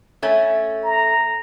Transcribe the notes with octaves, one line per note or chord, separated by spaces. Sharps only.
A3 C#4
A#5